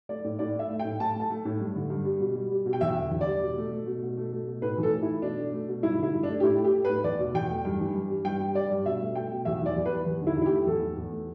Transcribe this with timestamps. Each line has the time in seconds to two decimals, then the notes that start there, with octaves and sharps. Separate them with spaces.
0.09 A3 D5
0.24 A2
0.39 A2 D5
0.55 A3 E5
0.69 A3
0.79 G5
0.85 A2
1.00 A2 A5
1.15 A3
1.20 A5
1.30 A3
1.45 A2
1.60 G2
1.76 D3
1.90 G2
2.05 G3
2.20 B2
2.35 G3
2.52 G3
2.66 B2
2.73 G5
2.81 E2 E5
2.96 D3
3.11 E2
3.21 D5
3.26 G3
3.42 B2
3.57 A3
3.71 A3
3.86 B2
4.03 B2
4.17 A3
4.32 A3
4.47 B2
4.62 A2 B4
4.78 E3 A4
4.93 A2
5.02 E4
5.07 A3
5.22 B2 D4
5.38 A3
5.53 A3
5.68 B2
5.83 G2 E4
5.99 D3 E4
6.13 G2
6.23 D4
6.28 A3
6.40 G4
6.43 A2 E4
6.59 A3
6.64 G4
6.73 A3
6.85 B4
6.89 A2
7.04 E2 D5
7.19 B2
7.34 E2 G5
7.50 A3
7.65 G2
7.80 E3
7.95 G2
8.10 G3
8.24 G2 G5
8.40 G3
8.55 G3 D5
8.70 G2
8.85 B2 E5
9.00 A3
9.15 A3 G5
9.31 B2
9.45 E2 E5
9.61 E3 D5
9.76 E2
9.86 B4
9.91 G3
10.06 E2
10.21 D3
10.27 E4
10.36 E2
10.42 E4
10.46 G4
10.51 A3
10.67 E2 A4
10.82 E3
10.97 E2
11.11 A3